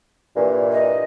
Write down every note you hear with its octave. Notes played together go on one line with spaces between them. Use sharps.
G2 A#2 E3
D#5